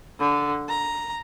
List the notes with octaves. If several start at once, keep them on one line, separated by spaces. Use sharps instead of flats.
D3
A#5